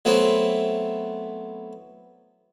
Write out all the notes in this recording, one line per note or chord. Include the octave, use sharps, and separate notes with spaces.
F#3 A3 B3 C4 E4